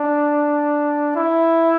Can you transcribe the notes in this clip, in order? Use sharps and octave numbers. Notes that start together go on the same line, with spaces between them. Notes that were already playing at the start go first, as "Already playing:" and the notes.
Already playing: D4
E4